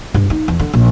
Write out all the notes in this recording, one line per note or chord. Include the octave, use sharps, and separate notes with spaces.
G2
D#4
E2
D3
A#1